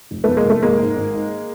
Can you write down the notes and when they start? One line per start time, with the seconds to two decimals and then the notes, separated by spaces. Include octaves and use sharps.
0.11 F1
0.24 F1 A3 B3
0.37 G#3 A#3
0.45 F1 A3
0.62 G#1 G#3 A#3
0.80 G#2
0.96 G#1
1.14 G#2